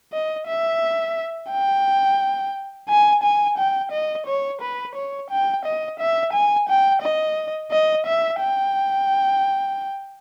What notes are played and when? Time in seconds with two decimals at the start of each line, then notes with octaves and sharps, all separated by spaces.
0.13 D#5
0.47 E5
1.51 G5
2.89 G#5
3.23 G#5
3.58 G5
3.92 D#5
4.27 C#5
4.61 B4
4.96 C#5
5.30 G5
5.65 D#5
6.00 E5
6.33 G#5
6.68 G5
7.02 D#5
7.71 D#5
8.07 E5
8.40 G5